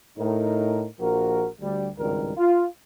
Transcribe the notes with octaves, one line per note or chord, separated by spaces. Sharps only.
A2 D#4 A#4
A#1 F3 F#4 A#4
D2 G3
G#1 C#2 G2 D#3 G3 A#4
F4